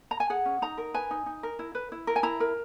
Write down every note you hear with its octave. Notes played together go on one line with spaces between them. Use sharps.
A#5
G#5
G#4 F#5
C#4
D#4 A#5
A#4
B4 G#5
D#4
D#4
A#4
E4
B4
E4
A#4
G#5
E4 A#5
A#4